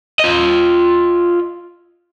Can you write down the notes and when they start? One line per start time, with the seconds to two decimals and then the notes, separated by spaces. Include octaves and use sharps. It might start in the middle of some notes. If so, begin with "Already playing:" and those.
0.20 F4 D#5